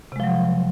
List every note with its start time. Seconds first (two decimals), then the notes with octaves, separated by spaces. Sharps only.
0.12 C3
0.16 G#3
0.20 F3
0.24 F#3